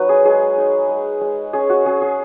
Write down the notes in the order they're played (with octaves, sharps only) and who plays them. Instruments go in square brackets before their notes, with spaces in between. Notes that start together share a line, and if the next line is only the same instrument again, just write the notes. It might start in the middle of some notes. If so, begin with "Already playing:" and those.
Already playing: [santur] F#3 D#4 B4
G#4
G#3 G#4
D#4
G#3
G#3
C#4 G#4
F#4
C#4 G#4
G#4